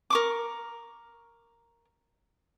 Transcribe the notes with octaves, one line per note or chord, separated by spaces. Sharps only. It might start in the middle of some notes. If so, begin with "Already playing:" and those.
A#4 C#6 D6